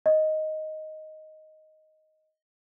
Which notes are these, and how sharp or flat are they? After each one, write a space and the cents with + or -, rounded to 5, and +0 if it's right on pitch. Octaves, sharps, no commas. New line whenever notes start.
D#5 +5